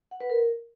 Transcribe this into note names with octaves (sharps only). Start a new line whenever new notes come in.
F#5
B4
A#4